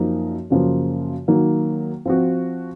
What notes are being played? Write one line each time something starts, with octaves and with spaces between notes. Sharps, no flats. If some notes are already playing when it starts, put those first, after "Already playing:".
Already playing: F#2 F3 A#3 D#4
F#2 C#3 F3 A#3 F4
D#3 F#3 A#3
F3 C4 F#4